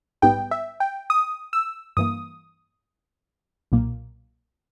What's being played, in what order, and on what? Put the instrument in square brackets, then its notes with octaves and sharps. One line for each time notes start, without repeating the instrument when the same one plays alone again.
[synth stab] A#1 G#2 G3 B3 G5
E5
G5
D#6
E6
G2 E3 A#3 D#6
B1 A#2 A#3